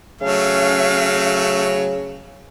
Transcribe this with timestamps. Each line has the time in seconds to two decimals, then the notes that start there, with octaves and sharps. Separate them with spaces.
0.22 C#3 F#3 A3 C#4 F5